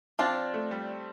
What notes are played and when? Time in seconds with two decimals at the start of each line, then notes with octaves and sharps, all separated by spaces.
0.19 F3 C4 D4 F4
0.54 A3
0.71 G3